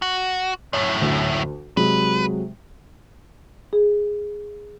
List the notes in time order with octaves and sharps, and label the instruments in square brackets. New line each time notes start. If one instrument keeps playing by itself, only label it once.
[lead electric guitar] F#4
[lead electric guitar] F#2 A2 [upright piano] C#5
[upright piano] D2
[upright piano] C3 F#3 G#3 [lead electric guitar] B4
[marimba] G#4